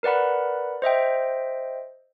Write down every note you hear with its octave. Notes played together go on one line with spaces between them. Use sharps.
A#4 B4 D5 F#5 B5
C5 D#5 E5 G5